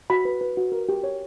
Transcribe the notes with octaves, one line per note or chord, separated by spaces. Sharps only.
F#4 B5
B4
B4
F#4
A#4
G4
C#5